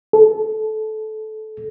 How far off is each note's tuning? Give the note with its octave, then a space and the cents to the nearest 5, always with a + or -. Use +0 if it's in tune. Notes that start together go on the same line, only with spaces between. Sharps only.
A4 -20